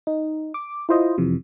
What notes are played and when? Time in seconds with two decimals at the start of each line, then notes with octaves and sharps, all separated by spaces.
0.07 D#4
0.54 D6
0.89 E4 F4 C5 D#5
1.18 F2 C3 E3